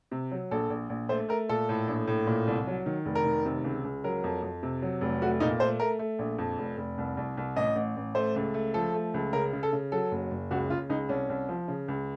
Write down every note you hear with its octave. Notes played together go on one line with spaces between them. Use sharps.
C3
F#3
A#1 A4
A#1
A#1
A3 C5
A3 A#4
A#2 A4
A2
A#1
A2
A#2
C2
F#3
D#3
F1
A#4
D#3
C3
C#2
C#2
F#3 A#4
F2
F2
C3
F#3
F1
A3 F#4
A#2 D#4
A3 C5
A3 A#4
A3
A#1
F2
F1
F1
C2
C2
C2
A1 D#5
A1
A1
A3 C5
C#2
A3
F3 A4
A3
C#2
C#3 A#4
C#3
A4
C#3
F#3 A4
F#1
F#1
C#2 F#4
C#3 F4
C#2 D#4
C2 C#4
C2
F3
C#3
C#2